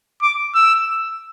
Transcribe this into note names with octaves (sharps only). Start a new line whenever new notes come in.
D6
E6